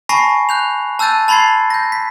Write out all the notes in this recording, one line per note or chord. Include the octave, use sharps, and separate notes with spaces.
G#5 A5 B5 C#6 A#6 C7
F#6 G6 F7
A5 E6 F#6 G6 A6 D#7
A5 B5 C6 G#6 A6 C7
G6 A#6
B6